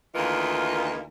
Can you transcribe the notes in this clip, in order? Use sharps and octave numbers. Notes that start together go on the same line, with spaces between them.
D2 D#3 E3 A#3 D#4 F4